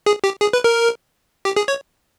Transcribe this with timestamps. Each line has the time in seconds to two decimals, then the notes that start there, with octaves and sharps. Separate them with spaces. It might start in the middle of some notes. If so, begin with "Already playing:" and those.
0.06 G#4
0.24 G4
0.41 G#4
0.53 B4
0.64 A#4
1.45 G4
1.56 G#4
1.68 C#5